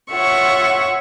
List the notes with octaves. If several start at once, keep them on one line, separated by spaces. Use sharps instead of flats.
F4 C#5 E5 F#5 C#6